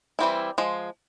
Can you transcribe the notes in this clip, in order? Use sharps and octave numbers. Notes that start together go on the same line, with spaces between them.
E3 G3 C4 E4
F3 G#3